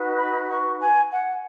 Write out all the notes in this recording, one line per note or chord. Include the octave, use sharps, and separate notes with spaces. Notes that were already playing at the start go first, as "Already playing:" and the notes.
Already playing: D#4 F#4 B4
B5
C#6
G#5
F#5